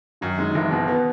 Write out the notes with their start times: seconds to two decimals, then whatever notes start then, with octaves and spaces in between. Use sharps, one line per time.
0.21 F#2 D#3 D#4
0.38 D#3 G#3 D#4
0.51 D#4
0.55 F#1 E3 E4
0.71 B2
0.88 B3